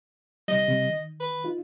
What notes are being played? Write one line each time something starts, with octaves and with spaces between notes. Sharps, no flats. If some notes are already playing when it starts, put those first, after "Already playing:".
C3 G3 D#5
C3 G3
D#3
B4
D#4 F4